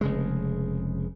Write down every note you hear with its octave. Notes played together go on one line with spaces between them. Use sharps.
F1 C#3 G#3